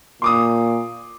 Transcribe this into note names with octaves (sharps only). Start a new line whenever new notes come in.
A#2 C6 D6 D#6